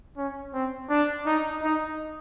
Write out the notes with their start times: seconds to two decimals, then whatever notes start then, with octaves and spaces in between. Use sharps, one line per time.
0.17 C#4
0.54 C4
0.90 D4
1.26 D#4
1.63 D#4